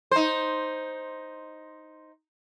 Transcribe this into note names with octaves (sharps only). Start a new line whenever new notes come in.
D#4 C5